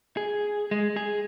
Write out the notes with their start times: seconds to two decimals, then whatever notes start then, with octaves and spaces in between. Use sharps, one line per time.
0.17 G#4
0.71 G#3
0.97 G#4